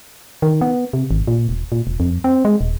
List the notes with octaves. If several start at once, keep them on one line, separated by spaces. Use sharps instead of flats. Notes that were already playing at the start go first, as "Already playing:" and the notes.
D#3
B3
C3
G#1
A#2
E1
A#2
E1
F2
C4
G#3
D#1